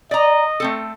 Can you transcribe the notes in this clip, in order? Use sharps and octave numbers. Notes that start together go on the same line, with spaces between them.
D5 D#5 A#5
A3 C4 A4